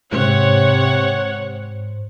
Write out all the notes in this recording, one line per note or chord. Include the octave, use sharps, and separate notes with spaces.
G#2 C3 C5 C#5 F#5